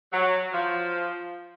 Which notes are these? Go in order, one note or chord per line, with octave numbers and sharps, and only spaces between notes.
F#3
F3